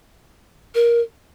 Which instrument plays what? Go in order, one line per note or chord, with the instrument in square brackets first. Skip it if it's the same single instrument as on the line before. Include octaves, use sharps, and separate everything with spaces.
[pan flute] A#4